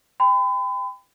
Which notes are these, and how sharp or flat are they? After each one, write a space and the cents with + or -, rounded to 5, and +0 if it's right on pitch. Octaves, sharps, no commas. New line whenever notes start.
G5 +25 B5 +40